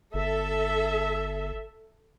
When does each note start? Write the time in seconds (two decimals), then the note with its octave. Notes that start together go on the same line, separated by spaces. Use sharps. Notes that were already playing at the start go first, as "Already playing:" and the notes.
0.14 G1 A4 E5